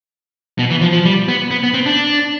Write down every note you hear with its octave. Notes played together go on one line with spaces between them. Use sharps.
B2
E3
F3
F3
G3
B3
B3
B3
C4
D4